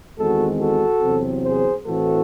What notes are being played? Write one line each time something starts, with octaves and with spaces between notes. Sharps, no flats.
E2 D#3 G#3 C4 F#4 A4
F#4 A4
E2 C3 F#3 C4
G#4 C5
A2 E3 A3 C4 F#4 A4